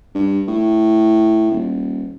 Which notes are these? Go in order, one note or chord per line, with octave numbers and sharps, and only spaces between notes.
G2
A2
D#1